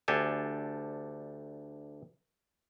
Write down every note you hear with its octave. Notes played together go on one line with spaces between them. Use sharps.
D2 D4 G4 A4 G#5